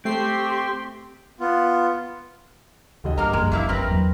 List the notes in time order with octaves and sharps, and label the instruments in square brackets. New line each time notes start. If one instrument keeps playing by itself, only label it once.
[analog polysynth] A3 C7 [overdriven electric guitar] C4 [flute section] G4 C6 C#6 [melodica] G5
[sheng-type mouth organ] B3 F4
[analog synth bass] D2 [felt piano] D3 G3 D#5
[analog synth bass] C2 [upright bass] G2 [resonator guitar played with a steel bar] A#3 A#4
[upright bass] F#1 F3 [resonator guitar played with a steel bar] G#3
[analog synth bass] C2 [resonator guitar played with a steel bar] E3 A#3 E4
[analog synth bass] G1 [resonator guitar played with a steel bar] C4 A#4 B4
[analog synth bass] E2 [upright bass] F#3 B3